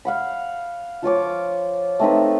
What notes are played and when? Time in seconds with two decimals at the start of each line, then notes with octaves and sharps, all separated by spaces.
0.05 F5 F#5 B5
1.02 F3 F4 C#5 D6
2.00 A3 C4 D#4 B4